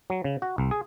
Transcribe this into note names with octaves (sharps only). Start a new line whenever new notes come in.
F#3
C#3
F#4
C2
G#4